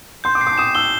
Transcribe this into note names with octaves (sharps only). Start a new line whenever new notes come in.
C6 G6
D6
C7
D6
D#6 E7
E6 G7